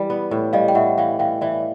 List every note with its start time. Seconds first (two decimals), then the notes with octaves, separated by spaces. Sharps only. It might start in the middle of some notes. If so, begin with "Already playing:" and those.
Already playing: E3 G3
0.10 B3
0.31 A2
0.53 G3 D#5 F5
0.68 G5
0.75 A2 E5 F#5
0.98 E3 F5 G5
1.19 E3 F5 G5
1.41 E3 D5 E5